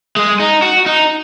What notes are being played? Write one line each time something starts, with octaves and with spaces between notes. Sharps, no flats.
G#3
D#4
F#4
D#4